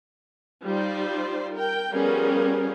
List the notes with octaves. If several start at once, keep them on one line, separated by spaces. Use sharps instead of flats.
G3 D#4 F4 C5 D5
A#4 G5
F3 G3 B3 C#4 G#4 A#4